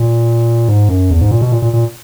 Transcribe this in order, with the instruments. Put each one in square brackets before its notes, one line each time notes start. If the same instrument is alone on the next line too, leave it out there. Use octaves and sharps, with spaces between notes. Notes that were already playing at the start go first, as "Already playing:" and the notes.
Already playing: [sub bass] A#2
G#2
F#2
E2
G#2
A#2
B2
A#2
A#2
A#2